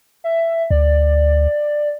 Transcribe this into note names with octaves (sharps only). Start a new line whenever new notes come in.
E5
D2 D5